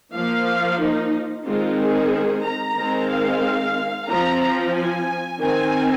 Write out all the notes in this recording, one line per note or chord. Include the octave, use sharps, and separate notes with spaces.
F3 A#3 F5
D#4
D#3 G#3 C4 F4
G#4
A#5
D#3 G#3 C4
F5
F3 C4 A#5
A#5
G#5
D#3 C4 G#5